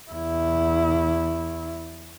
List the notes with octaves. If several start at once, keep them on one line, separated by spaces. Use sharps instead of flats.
E2 E4